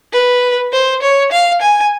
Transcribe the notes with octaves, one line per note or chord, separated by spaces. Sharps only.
B4
C5
C#5
F5
G#5